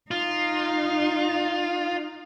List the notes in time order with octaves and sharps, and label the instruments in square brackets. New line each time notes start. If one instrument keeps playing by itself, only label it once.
[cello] D#4 [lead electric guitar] F4